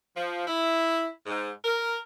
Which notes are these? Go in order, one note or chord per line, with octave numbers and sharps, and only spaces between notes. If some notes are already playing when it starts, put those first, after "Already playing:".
F3
E4
G#2
A#4